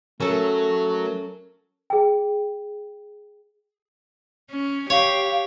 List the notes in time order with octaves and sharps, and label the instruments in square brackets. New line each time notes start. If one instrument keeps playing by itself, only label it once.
[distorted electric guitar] F#3 [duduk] A3 [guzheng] C#4 A4 [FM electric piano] A#4
[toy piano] G#4 G5
[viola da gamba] C#4
[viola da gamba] G4 [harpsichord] C#5 [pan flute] F5